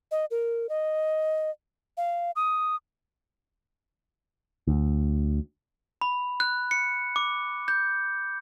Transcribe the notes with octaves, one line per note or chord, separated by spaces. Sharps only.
D#5
A#4
D#5
F5
D#6
D2
B5
F#6
C#7
D6
G6